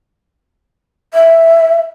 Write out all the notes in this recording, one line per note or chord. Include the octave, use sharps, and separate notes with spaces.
E5